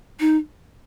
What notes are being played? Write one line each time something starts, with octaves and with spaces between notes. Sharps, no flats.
D#4